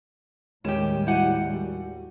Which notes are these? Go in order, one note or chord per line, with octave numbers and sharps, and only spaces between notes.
D#2 A2 G3 G#3 C#4 G4 E7
E4 F#4 G4 F#5 G#5
F#4